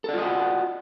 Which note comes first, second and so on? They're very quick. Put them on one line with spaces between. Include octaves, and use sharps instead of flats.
A4 D5 F4 D#5 F#4